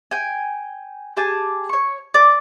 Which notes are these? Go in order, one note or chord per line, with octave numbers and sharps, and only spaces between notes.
G5 G#5
G4 G#4 G#5 A5
C#5 C#6
D5